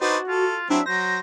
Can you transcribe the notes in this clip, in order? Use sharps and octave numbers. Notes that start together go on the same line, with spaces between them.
D4 D#4 F#4 B4 C5
F4 A4
F#3 C4 D4 E4 E5
F#3 C5 A#6